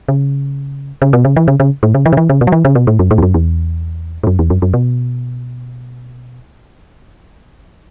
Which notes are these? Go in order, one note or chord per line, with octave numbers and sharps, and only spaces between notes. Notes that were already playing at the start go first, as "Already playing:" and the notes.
C#3
C#3
B2
C#3
E3
C#3
C#3
A2
C#3
E3
C#3
E3
C#3
B2
F#3
E3
C#3
B2
A2
F#2
A2
E2
F#2
E2
A2
F#2
E2
F#2
F#2
B2